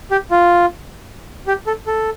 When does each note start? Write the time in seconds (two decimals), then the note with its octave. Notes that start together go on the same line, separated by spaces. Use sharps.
0.11 G4
0.31 F4
1.47 G4
1.67 A4
1.87 A4